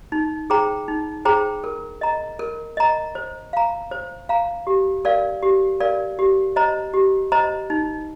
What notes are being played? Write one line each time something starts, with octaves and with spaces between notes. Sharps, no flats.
D#4
G#4 C5 G5 A#5
D#4
G#4 C5 G5 A#5
A#4
D#5 A#5
A#4
D#5 A#5
C5
F5 A#5
C5
F5 A#5
G4
A#4 D5 F5
G4
A#4 D5 F5
G4
C5 D#5 A#5
G4
C5 D#5 A#5
D#4